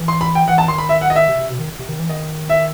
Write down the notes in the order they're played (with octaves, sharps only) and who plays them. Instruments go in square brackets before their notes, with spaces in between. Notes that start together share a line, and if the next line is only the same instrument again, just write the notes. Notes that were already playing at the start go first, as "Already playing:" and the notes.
Already playing: [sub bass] E3
[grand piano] C6
B5
G5
[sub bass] E3 [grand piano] F#5
[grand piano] A5
[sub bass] D#3 [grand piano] C6
[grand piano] B5
E5
F#5
D#5
E5
[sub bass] C3
C3
B2
D#3
C3
D#3
E3
[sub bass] D#3 [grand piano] D#5
[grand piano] E5